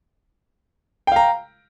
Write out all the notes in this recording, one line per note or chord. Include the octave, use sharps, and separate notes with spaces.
F5 G5 A#5